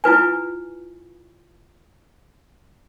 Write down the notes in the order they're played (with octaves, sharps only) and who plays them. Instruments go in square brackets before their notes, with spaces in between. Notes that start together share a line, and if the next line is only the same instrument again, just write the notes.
[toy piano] E4 F4 B4 G#5